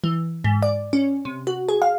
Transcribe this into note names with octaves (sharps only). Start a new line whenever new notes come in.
E3
G#2
D5
C#4
C3
F#4
G#4
F5